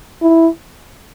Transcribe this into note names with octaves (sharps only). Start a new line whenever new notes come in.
E4